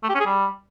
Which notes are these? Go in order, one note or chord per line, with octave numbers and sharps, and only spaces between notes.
A3
G4
C#4
G#4
G3